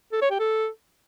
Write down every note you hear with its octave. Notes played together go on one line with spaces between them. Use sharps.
A4
C#5
G4
A4